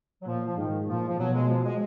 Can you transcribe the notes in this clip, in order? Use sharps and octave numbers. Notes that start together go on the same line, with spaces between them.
F#3
A#2 F3
F3
G#2 D#3
A#2 F3
F3
B2 F#3
G#3
F3
G#3